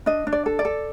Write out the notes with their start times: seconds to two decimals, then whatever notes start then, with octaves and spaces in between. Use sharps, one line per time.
0.06 D4 D#5
0.27 D4
0.33 D5
0.46 A4
0.59 D5
0.65 A4